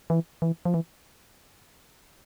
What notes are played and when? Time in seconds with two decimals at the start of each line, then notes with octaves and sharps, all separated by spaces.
0.10 E3
0.42 E3
0.65 F3
0.74 E3